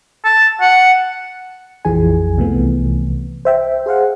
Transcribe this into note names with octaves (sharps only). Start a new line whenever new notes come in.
A5
F#5
A#1 F2 E3 F3 G#4 G#5
C2 C3 E3 F3 A3 B3
C5 E5 G5
G#4 C5 F5 F#5